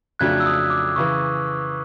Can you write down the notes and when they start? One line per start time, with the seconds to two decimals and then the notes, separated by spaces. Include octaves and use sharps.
0.19 F2 C#3 F#3 A3 D4 F#6 G#6
0.40 E6
0.46 D#6
0.70 D6
0.96 C#3 E3 C#6